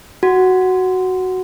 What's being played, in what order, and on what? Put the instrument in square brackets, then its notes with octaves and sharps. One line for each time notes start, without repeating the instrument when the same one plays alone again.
[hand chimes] F#4